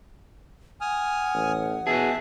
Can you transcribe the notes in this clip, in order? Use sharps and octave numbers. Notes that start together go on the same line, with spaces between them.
F#5 G#5 D#6 F6
A1
B2 F#4 G#4 E5 A5